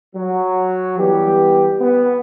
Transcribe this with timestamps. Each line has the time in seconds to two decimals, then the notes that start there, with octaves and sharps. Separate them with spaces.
0.16 F#3
0.99 E3 G3 B3 G4
1.81 B3